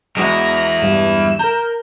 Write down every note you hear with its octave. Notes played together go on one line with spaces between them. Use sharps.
E2 G#3 E4 F#4 A#5
G2 E7
A#4 A#5 G6